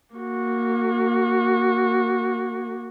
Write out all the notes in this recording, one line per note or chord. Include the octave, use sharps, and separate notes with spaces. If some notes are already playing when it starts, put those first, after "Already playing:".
A#3 F#4